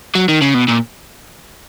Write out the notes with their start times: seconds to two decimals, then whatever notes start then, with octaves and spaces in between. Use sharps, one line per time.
0.15 F#3
0.29 D#3
0.42 C#3
0.54 B2
0.68 A#2